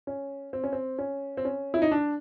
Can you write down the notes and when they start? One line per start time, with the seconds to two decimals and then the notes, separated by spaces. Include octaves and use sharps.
0.07 C#4
0.53 C4
0.64 C#4
0.73 C4
0.99 C#4
1.37 C4
1.45 C#4
1.74 E4
1.82 D#4
1.91 D4